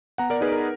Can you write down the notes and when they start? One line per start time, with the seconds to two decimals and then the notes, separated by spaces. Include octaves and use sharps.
0.18 B3 F#5 A#5
0.30 A#4 D5
0.41 D#4 G#4 B4
0.52 A#4